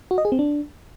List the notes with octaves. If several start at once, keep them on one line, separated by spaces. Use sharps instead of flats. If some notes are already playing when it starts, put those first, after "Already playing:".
F#4
D#5
G#4
C4
D4